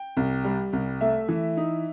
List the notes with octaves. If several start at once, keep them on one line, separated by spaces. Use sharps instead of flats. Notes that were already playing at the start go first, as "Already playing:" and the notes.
Already playing: G5
C2
G3
C2
A3 E5
E3
D#4